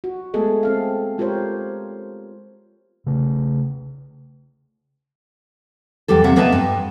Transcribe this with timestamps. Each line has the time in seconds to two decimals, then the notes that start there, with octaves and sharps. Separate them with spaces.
0.04 F#4
0.34 G#3 A3 B3 G#4 A4 D#5
0.63 C4 A4 F5
1.18 G#3 F4 G4 A#4 C5 C#5
3.06 C#3 A3
6.08 E2 G3 G4 A4
6.24 C3 A#3 E5 F#5
6.36 A#3 B3 B4 D#5 E5 A5
6.52 G2